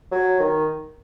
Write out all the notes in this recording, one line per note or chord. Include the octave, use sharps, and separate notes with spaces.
F#3
D#3